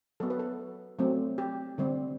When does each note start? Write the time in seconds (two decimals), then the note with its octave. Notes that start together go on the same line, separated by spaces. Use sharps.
0.20 F#3 B3 A4
0.30 B4
0.39 A4
0.99 F#3 A3 C4
1.38 G4
1.78 D3 G3 C4